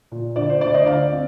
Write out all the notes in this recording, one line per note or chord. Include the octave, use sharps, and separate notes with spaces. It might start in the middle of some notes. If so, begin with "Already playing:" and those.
A#2
D3 D5
C5
D2 D5
C5 D#5
D3 D5 F5
C4